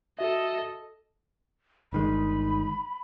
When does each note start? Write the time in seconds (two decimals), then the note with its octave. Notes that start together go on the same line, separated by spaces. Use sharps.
0.19 F#4 A4 D#5 E5
1.93 G1 D#3 G#3 B5